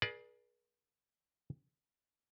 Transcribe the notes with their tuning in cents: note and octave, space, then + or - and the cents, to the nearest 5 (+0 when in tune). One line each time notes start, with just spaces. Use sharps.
G#4 +15 B4 -45 D5 +10